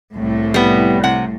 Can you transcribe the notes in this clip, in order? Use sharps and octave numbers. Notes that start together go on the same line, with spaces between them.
C2 A2
G3 B3
C3 F#5